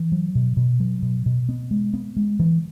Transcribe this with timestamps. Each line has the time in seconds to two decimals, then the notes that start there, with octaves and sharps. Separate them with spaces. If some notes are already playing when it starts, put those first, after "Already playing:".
Already playing: E3
0.12 F#3
0.35 B2
0.57 B2
0.80 F#3
1.02 B2
1.26 B2
1.49 B3
1.71 G#3
1.94 B3
2.16 G#3
2.39 E3